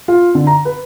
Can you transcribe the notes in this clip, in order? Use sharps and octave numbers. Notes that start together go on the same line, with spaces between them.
F4
D3
A#5
B4